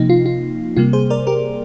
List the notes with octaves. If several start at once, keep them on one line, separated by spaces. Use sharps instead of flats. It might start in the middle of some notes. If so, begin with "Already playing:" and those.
Already playing: C3 F3 A#3 D#4
F4
F4
C3 G3 A#3 F4
G#4 C5
A#4 D5
G4 A#4